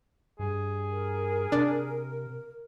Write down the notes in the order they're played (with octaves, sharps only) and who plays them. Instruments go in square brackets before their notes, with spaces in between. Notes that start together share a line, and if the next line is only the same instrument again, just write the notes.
[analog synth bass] G2 [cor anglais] G#4
[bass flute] A#4
[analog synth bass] C3 [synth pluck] D4